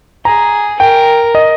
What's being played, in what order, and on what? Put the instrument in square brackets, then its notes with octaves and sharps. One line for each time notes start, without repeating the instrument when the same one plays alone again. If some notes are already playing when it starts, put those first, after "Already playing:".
[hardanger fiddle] G#4 [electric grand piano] A#5
[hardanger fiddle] A#4 [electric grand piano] G5
[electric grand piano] D#5